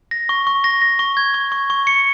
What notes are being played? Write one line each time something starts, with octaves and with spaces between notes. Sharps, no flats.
A#6
C#6
C#6
A#6
A#6
C#6
G#6
C#6
C#6
C#6
C#7